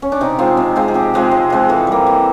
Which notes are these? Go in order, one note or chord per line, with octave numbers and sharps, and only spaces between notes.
C#4
D4
C3 D#4
F3 G#3 C4
C3
F3 G#3 C4
G#4
C3 G4
F3 G#3 C4
C3
F3 G#3 C4
E3 A4
G3 A#3
E3